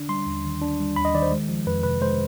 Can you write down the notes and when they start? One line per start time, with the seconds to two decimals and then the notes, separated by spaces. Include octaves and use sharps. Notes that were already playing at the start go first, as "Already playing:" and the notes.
Already playing: D3 D4
0.09 G3 C6
0.27 D#2
0.45 D#3
0.62 D4
0.80 G3
0.96 D#2 B5
1.05 D#5
1.14 D#3 D5
1.22 C5
1.31 G#3
1.49 F3
1.67 F2 B4
1.83 C3 B4
2.01 G#3 C5